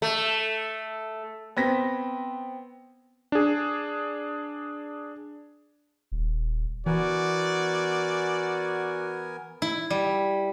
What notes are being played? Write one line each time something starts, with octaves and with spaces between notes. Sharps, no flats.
A3
B3 C4 A#6 B6
D4 G#4
D#1
E3 B3 F#4 A#4 D5 G#5
E4
G3